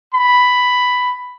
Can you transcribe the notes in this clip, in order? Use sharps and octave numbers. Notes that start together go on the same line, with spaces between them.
B5